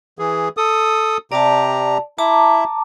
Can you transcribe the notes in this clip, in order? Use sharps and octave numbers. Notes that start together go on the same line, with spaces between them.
E3 G#4
A4 D#6
C3 G4 D5 A5 A#5
E4 E5 A5 A#5 D6